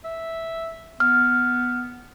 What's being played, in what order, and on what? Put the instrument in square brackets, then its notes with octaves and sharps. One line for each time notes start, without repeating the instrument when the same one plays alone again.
[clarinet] E5
[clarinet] B3 [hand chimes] F6